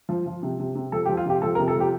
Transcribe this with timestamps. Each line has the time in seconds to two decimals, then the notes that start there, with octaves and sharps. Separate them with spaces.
0.09 F3
0.26 F3
0.43 C3
0.59 C3
0.75 C3
0.92 F3 A4
1.05 G4
1.09 F3
1.17 F4
1.26 C3 G4
1.42 F3 A4
1.55 A#4
1.59 C3
1.68 A4
1.75 F3 G4